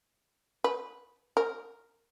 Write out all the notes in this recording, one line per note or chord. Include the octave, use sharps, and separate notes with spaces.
B4
A#4